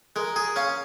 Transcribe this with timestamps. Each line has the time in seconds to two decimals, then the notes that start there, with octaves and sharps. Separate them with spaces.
0.16 G#3 A#4
0.36 G#4
0.56 C#4 F5